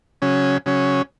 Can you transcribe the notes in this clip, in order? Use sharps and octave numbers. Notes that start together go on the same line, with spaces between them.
C#3 F#3 C#4
C#3 F#3 C#4